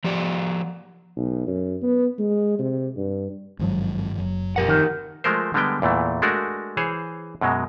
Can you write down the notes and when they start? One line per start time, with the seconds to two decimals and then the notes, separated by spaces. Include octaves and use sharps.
0.04 F3 G4 D5
1.16 B1
1.47 F#2
1.82 B3
2.19 G#3
2.59 C3
2.96 G2
3.59 G#1 G2 D#3 F3 F#3 G#3
4.18 F#1 F#3
4.56 F2 A#2 F3 G4 A#4 F#5
4.69 D#3
5.24 F3 G#3 A3 A#4 C5
5.54 D3 G3 G#3 B3 G5
5.82 E2 A#2 E3 A3
6.22 G#3 A3 D4 F#4 A#4
6.77 E3 G#4 C5 C#5
7.41 F#2 B2 F#3 G#3